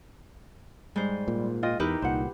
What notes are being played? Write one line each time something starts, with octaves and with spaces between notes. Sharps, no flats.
G#2 G3 C5
A#2
F4 D#5 G5
E2 D#4 E4 G4 A#4 B4 D#5
C2 A#2 C5 F#5